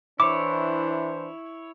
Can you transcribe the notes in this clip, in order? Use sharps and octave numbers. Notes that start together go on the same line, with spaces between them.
E3 D4 E4 C5 C#5 D6